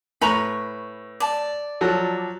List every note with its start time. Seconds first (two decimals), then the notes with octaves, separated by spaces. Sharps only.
0.22 A2 B4 A#5 C#6
1.20 D5 A5
1.81 F3 F#3 A4